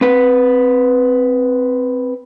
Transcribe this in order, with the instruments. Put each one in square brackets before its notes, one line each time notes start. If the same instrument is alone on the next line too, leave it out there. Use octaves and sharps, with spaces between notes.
[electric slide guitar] C4 B4